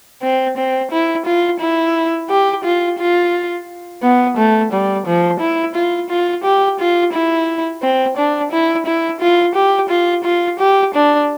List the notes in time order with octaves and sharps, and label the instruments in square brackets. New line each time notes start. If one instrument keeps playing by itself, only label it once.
[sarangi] C4
C4
E4
F4
E4
G4
F4
F4
B3
A3
G3
F3
E4
F4
F4
G4
F4
E4
C4
D4
E4
E4
F4
G4
F4
F4
G4
D4